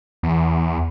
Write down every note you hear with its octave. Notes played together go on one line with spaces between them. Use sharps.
E2